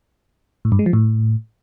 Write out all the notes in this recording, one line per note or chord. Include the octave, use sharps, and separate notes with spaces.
A2
G2
G#3
F3
A2